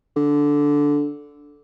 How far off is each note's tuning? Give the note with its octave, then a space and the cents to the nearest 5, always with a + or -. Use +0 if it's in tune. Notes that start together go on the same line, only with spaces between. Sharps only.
D3 -10